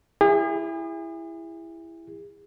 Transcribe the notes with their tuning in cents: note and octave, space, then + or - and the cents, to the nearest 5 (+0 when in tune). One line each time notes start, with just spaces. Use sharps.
E4 +10 G#4 -40